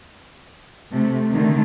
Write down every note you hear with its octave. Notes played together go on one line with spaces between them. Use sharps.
C3 A3
D3 D#3 A3